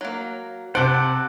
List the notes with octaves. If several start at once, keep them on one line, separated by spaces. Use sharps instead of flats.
F#3 A#3
C3 C5 F#5 A5 D7